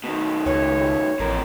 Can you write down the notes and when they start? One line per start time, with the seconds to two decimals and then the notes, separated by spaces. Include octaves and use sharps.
0.04 B2 D#3
0.46 C#2 C#5
1.19 A1 F2 A#4